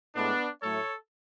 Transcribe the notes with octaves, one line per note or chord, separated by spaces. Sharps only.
A2 G#3 B3 D4
A2 F#3 A3 A4 C#5